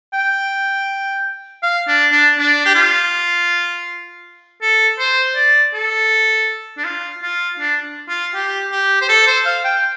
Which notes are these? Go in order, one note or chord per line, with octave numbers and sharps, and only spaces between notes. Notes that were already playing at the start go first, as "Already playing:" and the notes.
G5
F5
D4
D4
D4
G4
F4
A4
C5
D5
A4
D4
F4
F4
D4
F4
G4
G4
C5
A4
C5
F5
G5